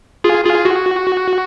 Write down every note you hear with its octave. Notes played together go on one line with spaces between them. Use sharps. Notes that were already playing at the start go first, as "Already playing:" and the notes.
F4 G#4
F4 G#4
F#4